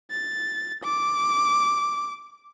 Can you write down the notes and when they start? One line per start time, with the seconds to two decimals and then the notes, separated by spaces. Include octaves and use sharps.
0.11 A6
0.83 D6